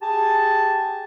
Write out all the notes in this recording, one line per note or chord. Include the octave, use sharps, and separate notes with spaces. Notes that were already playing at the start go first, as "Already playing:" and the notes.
G4 G#4 G#5 A5